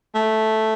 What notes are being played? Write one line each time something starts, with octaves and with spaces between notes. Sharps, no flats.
A3